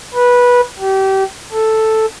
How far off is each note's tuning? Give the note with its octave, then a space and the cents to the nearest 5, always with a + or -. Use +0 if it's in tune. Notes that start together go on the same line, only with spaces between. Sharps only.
B4 -15
G4 -30
A4 +0